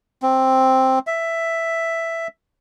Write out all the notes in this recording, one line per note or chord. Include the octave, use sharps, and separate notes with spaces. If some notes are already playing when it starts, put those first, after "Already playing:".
C4
E5